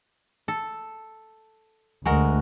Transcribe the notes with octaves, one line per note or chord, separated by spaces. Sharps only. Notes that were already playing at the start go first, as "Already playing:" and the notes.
A4
D2 G#3 F#4 A#4